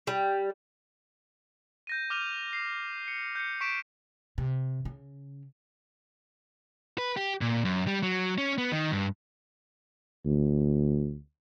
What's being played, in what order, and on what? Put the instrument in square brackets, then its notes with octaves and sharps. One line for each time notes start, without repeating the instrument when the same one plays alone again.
[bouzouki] G3
[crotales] G6 A#6 D#7
D6 F6 D#7 F7
C7
C#7
G6 C#7
C#6 B6 D7 E7
[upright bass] C3
C#3
[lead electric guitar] B4
G4
A#2
F#2
G3
F#3
C#4
B3
D#3
G2
[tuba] D2